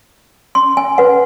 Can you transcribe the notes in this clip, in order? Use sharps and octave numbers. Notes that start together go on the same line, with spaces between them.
C6
G#5
B4 F#5